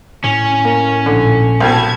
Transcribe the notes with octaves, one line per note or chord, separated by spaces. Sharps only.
A2 C#4
A#3
A#1 D3
C2 B2 A5 G#6